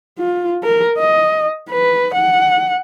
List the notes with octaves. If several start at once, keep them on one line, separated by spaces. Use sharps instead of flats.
F4
A#4
D#5
B4
F#5